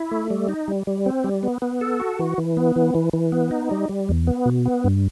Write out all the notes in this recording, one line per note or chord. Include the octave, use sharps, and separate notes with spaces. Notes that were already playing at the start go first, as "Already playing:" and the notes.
Already playing: E4
A3
G3
D#4
G3
G3
C4
G3
B3
B3
A4
F#4
E3
E3
B3
E3
E3
E3
B3
D#4
G3
G3
E2
B3
B2
B3
G2